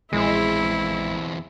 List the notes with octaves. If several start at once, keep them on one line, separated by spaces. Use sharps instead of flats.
A#1 E2 G#3 C4 E4